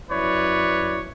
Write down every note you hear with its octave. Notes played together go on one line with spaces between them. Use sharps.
F#2 E4 B4 C#5 D5